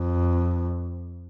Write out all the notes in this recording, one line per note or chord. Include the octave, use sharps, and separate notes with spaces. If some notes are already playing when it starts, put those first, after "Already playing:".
Already playing: F2